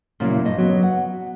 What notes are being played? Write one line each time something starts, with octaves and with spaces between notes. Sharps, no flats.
A#2 C#3 F#3 A#3 E4
G2 D#5
F#3 B3
F#5